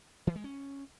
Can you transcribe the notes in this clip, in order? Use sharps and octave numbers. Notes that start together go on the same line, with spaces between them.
E3
G#3
C#4